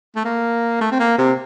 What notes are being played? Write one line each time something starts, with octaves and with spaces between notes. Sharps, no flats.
A3
A#3
A3
C4
A#3
C3